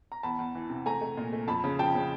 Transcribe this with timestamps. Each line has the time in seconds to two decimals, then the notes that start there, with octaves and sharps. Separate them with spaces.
0.12 A#5
0.23 E2 A5 B5
0.39 E2
0.55 E3
0.70 C3
0.86 A3 G#5 A#5
1.01 A3
1.17 A#2
1.32 A3
1.48 F2 A5 B5
1.64 C#3
1.79 F3 G5 A5
1.95 C#3